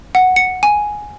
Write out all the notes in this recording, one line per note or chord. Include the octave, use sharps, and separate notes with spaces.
F#5
C#7
G#5